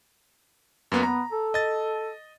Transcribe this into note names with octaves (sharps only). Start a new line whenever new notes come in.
F#2 A#3 B3
B3 A#5
A4
D#5 A6